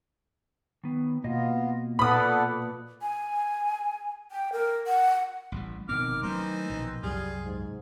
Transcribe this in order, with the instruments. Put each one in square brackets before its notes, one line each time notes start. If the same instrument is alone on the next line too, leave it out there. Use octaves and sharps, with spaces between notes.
[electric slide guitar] D#3 B3
[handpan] B2 [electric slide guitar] A#3 D#5 [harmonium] B3 F4
[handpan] A#2 B4 F#5 [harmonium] B3 A4 D5 [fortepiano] B5 D#6
[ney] G#5
G5
A#4
F#5
[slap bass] A1 E3 G3
[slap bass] F1 B2 C4 [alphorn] D#3 [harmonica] D6 F6
[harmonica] E3 D#4 C5 [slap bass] F#3 A3 C#4
[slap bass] A#1 B2
[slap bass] C2 F#2 [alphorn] G3 [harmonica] F4 G#4
[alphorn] G#2